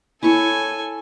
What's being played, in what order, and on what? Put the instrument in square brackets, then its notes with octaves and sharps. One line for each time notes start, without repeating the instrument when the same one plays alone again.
[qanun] E4 C#5 C#6 [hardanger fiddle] A4 G#5